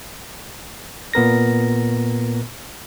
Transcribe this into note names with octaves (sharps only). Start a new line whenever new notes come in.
A#2 B3 A#4 A#6